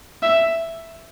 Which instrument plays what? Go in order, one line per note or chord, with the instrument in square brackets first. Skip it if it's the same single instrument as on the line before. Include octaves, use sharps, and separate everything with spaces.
[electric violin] E5